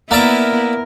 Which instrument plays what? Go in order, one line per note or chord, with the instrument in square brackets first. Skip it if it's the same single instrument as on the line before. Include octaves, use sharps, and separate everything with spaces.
[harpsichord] A#3 D5 E5 [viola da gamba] B3 E4 [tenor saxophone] A#4